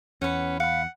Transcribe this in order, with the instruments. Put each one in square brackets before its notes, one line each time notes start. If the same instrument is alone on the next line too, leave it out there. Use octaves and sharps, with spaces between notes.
[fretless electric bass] E2 [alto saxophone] C#4 [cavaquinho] B4 F#5
[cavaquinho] F5 B5 [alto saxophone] F#5